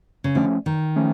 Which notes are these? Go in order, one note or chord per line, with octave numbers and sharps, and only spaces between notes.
C#3
D3 F3 A3 C#4
D#3
F3 A3 C#4